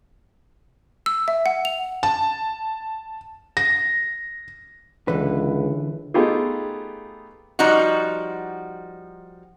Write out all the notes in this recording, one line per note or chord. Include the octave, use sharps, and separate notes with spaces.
E6
E5
F#5
F7
A5
A#6
C#2 D3 E3 B4
A3 B3 D#4 F4 G4 G#4
F3 G3 D#4 F#4